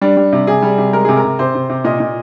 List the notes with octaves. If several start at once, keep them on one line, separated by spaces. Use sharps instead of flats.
G3 D4
G3
C3
C3 G#4
G3
C3
G#3 A#4
C3 G#4
A#4
C3
C3 C5
C3
C3
A#2 D#5
A#2